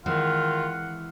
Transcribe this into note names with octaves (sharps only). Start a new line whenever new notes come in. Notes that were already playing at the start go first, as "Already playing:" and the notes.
D#3 E3 G#3 C4 F4 F#5